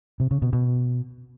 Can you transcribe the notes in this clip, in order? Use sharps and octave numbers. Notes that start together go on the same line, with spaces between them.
C3
C#3
B2
B2